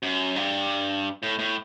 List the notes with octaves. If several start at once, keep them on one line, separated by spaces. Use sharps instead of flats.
F#2
G2
A2
A2